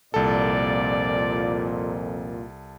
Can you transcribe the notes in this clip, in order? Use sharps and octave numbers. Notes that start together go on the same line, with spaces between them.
C2 F2 A#2 A4 D5